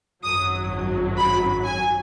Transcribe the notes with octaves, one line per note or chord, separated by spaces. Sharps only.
G#1 F#2 F#3 D#6
B5
G#5